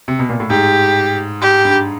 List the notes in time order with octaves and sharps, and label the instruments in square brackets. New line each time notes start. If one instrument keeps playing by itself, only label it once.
[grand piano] C3
B2
A#2
A2
[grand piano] G#2 [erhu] G4
[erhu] G4
[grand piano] G2